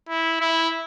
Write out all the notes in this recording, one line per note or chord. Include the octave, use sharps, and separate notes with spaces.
E4
E4